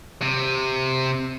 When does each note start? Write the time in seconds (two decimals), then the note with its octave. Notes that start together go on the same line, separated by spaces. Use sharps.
0.22 C3